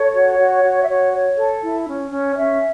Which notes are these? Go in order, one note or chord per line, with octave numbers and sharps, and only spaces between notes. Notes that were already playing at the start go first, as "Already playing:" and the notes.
Already playing: A4 C#5
F#4
F#4
F#4
E5
F#4 C#5
C#5
A4
E4
C#4
C#4
C#5
C#4 E5